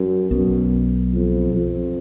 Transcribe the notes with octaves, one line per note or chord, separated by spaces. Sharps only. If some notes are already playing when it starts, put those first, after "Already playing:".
Already playing: F#2
B1 F#2 B2
F2
F2